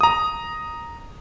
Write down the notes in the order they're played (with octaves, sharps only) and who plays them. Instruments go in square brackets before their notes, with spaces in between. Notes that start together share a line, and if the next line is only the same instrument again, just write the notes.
[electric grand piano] A#5 D#6